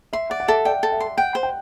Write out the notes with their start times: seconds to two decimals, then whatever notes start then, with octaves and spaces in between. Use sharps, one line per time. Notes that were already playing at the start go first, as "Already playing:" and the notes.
0.13 E5 C6
0.30 D5 F#5
0.40 F#5
0.48 A4 E5
0.65 D5 G5
0.83 A4
0.92 E5
1.00 C6
1.17 F#5 G5
1.35 C5
1.43 G5